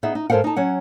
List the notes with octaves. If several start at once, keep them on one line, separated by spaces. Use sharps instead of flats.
B3 D#4 G#4 D#5 E5
D#4
G#2 A4 A#4 C5 F5 F#5
D#4 A5
F#3 C#4 F#5